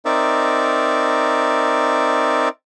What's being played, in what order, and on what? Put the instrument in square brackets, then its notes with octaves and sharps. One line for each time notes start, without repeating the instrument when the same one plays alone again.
[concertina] C4 D#4 A#4 D5 E5